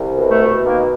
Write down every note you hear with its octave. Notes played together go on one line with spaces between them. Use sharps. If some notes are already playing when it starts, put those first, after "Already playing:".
Already playing: C2
B2
A3
B2
D#3 A#3